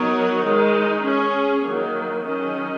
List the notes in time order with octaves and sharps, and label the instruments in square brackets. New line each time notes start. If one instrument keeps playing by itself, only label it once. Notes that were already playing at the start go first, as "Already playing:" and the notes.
Already playing: [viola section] F#3 B3 D#4 A#4 C#5
D#3 G#3 D#4
C#4 G#4 C#5
D#3 F#3 A#3
D#3 F#3 C#4 G#4 D#5